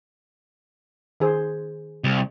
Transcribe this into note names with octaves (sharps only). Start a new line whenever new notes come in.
D#3 G#4 C5
C2